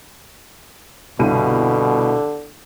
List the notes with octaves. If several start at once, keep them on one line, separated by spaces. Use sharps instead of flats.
G1 C2 B2 D3 D#7